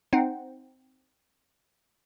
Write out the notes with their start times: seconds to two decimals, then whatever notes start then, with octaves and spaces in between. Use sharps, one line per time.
0.13 C4 D#4 C5 F#5